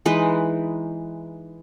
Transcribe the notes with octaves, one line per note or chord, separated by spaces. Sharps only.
E3 G#3 D#4 B4